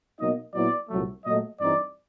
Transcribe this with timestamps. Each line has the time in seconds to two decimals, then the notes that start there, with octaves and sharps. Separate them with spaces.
0.20 B2 F#3 A#3 D#4 D#5
0.55 A#2 F#3 B3 E4 D5
0.90 C2 A#2 F#3 A3
1.26 A#2 F#3 A3 D#5
1.60 G2 E3 G3 C4 D#4 D5